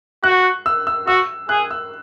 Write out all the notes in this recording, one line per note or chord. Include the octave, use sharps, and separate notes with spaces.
F#4 F#6
E6
E6
F#4 E6
G#4 F#6
E6